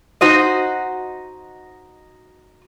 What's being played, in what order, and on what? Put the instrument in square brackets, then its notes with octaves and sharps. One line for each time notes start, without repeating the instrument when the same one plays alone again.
[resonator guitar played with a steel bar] D#4 F#4 C5 D#5